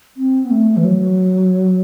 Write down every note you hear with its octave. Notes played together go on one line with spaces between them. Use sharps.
C4
B3
A3
E3
F#3